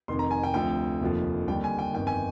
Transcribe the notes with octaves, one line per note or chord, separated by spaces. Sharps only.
F1 F2 D#3 C6
A#5
G#5
G5
D2 C3 F3 G5
F1 D#2 D3 F3
D#2 D3 G3 G5
G#5
G5
G1 F2 D#3 G5
G#5